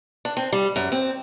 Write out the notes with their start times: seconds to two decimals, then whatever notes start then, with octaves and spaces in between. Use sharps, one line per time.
0.25 D4
0.37 C4
0.53 G3
0.76 F#2
0.92 C4